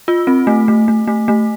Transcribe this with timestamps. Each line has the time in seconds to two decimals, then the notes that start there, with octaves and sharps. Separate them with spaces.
0.08 F4
0.27 C4
0.47 A3
0.68 A3
0.88 A3
1.08 A3
1.28 A3